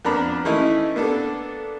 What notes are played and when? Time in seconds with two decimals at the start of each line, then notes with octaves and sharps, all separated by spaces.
0.05 F2 A#3 B3 D4 A#5 B5
0.45 E3 A3 A#3 C#4 D#4 E4
0.96 A#3 B3 D4 A4